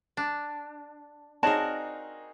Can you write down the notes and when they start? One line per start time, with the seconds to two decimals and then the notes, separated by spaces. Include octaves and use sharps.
0.17 D4
1.43 C4 D#4 F#4 G#4 A#4 C#5 D5 A5